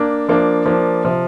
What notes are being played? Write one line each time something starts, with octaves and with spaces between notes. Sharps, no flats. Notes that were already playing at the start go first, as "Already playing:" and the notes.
Already playing: A#3 D4
F3 A#3 D4
F3 A#3 D4
C3 F3